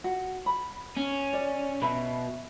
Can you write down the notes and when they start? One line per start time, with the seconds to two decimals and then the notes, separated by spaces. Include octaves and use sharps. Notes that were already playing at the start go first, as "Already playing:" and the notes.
0.04 F#4
0.46 B5
0.97 C#4
1.33 D5
1.82 B2 E5 B5